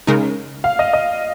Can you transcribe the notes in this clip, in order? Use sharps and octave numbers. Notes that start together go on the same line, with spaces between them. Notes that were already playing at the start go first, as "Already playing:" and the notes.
C#3 G#3 D#4 A#4
F5
D#5
D#5